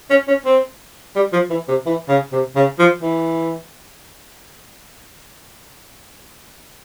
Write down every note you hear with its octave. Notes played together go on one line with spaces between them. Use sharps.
C#4
C#4
C4
G3
F3
E3
C3
E3
C#3
C3
C#3
F3
E3